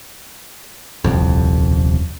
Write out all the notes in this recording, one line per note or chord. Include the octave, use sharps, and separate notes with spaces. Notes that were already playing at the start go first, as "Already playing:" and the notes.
D#1 C2 F2